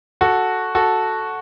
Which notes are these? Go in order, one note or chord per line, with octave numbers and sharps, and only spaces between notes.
F#4 A4
F#4 A4